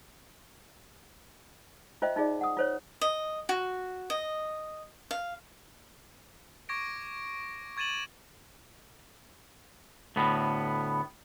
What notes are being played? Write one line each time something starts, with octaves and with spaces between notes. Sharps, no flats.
F4 C5 D#5 E5 G5
D#4 F4 G#4 D5
F#5 D#6
F4 C5 C#5
D#5
F#4
D#5
F5
C#6 D6 G#6 A#6 D7
C#6 G#6 A6 D#7 E7 F#7
D2 A2 B3